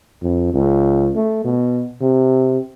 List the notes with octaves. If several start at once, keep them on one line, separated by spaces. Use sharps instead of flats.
F2
C#2
A3
B2
C3